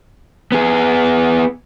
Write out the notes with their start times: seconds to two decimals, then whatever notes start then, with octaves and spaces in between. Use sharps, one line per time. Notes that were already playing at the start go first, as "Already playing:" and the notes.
0.52 B3 G#4